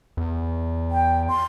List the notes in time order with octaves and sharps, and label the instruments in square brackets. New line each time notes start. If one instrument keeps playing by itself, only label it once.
[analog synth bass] E2
[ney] G5
C6